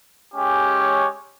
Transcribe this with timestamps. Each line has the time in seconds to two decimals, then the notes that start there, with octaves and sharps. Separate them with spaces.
0.33 G#3 C#4 G4
0.80 C#5